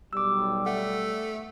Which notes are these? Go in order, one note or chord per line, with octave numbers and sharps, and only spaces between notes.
B1 G3 D6 E6
A3 F#5